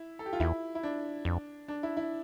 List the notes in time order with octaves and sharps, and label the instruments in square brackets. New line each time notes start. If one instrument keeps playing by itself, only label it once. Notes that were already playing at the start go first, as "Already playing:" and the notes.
Already playing: [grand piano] E4
A4
G4
F4
[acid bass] E2 [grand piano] E4
[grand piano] E4
D4
[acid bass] F2
[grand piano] D4
E4
E4